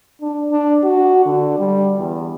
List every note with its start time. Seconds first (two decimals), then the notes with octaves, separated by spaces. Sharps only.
0.21 D4
0.51 D4
0.83 F#4
1.25 D3
1.59 G3
1.99 E2